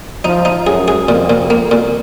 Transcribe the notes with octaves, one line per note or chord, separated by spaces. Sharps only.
F3 D#4
D#4
F#2 G#4
G#4
F2 A#2
A#2
A#3
A#2